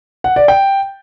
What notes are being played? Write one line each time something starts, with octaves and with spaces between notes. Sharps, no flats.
F#5
D5
G5